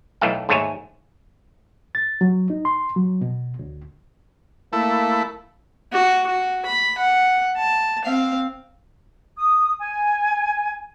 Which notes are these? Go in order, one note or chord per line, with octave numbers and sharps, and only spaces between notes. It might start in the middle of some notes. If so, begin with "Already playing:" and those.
B1 E3 A3 E5 F5 G5
D#2 G#2 A3 C#5 E5 G#5
A6
F#3
D#4
C6
F#3
B2
D2
A3 A#3 E4
F#4
F#4
B5
F#5
A5
C4 F5
D#6
G#5